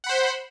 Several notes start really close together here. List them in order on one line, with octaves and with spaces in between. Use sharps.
F#5 B5 C5